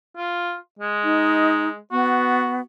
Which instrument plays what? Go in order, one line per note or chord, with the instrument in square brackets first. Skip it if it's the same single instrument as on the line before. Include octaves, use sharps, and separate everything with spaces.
[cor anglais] F4
G#3
[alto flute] D#4
[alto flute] B3 [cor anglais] F#4